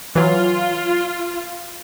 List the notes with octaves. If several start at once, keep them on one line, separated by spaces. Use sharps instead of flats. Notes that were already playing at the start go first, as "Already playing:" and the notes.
E3 F#3 F4